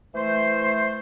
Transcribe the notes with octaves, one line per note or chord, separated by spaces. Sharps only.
E3 A3 C5